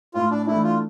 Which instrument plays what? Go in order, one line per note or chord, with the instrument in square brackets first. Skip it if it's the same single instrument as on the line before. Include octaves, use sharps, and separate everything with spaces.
[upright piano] A2 [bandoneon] F4
[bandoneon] D4
[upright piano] E3 A3 D4 [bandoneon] E4
[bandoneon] F4